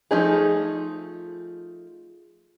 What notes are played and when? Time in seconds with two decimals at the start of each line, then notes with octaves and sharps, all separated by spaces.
0.11 F3 A3 D#4 G#4